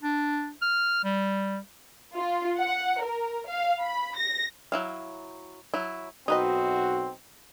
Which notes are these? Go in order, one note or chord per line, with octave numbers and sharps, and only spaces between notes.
D4
F6
G3
F4
F#5
A#4
F5
B5
A#6
F#3 E4 F5
F#3 E4
B1 C4 D#4 F#4 B4 D#5